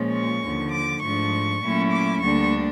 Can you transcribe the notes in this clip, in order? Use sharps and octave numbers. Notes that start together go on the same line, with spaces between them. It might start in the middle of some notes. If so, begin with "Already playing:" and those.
Already playing: A#2 F3 G#3 C#4
C#6
D#2 D3 F3
D6
G#2 F3 A3 D4 C#6
A#2 F#3 A3 C#4 E4
D6
D2 D3 G3 A#3 D4 C#6